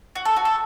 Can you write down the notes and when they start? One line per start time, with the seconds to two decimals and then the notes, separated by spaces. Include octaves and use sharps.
0.16 F#4
0.25 A4
0.36 F#4
0.45 A4